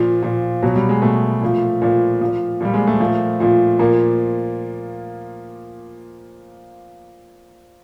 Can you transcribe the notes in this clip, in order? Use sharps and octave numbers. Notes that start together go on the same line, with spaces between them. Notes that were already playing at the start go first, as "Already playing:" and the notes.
Already playing: A#2 F3
A#2 F3
B2 F#3
G3
G#3
B2 A3
A#2 F3
A#2 F3
A#2 F3
A#2 F3 G3
G#3
A3
A#2 F3
A#2 F3
A#2 F3 A#3